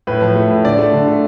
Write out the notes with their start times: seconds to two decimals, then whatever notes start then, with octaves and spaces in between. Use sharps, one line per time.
0.07 A2 B4
0.22 F3
0.36 A3
0.50 A2
0.64 D3 D5
0.79 A3
0.93 D3
1.07 A3